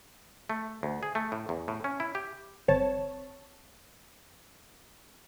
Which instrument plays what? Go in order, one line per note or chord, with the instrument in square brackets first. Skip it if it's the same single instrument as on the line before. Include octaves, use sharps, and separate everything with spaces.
[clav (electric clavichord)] A3
D2
G#4
A3
A2
E2
A2
C#4
E4
G4
[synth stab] G1 C4 C#5 A5